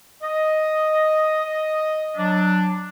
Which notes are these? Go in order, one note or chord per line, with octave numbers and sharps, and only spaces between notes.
D#5
F#3 D4